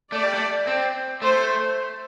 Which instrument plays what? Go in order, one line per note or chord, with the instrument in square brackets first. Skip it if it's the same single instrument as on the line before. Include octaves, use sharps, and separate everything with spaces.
[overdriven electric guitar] A3 [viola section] D5
[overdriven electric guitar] G3
A3
C4
[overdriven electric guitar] A3 [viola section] C5